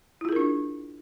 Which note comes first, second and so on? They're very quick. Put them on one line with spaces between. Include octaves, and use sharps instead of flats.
E4 F4 G#4 A#4 D4